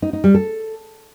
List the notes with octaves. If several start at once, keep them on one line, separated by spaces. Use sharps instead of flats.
D#4
D#4
G3
A4